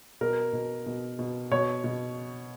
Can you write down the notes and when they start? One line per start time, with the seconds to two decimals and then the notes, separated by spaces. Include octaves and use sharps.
0.21 B2 A#4
0.53 B2
0.86 B2
1.19 B2
1.51 B2 C#5
1.84 B2